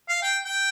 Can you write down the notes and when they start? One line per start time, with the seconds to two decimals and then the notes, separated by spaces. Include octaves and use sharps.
0.09 F5
0.22 G5
0.45 G5